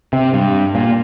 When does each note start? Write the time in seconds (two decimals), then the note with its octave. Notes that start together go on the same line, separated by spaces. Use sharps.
0.13 C3
0.34 G2
0.75 A#2